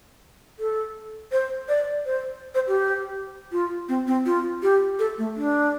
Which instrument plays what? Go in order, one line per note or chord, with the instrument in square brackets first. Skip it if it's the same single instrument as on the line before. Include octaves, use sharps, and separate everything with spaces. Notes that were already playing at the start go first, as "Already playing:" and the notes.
[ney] A4
C5
D5
C5
C5
G4
F4
C4
C4
F4
G4
A4
A3
D4